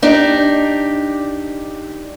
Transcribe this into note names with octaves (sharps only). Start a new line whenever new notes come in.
D4 D#4 G4 D5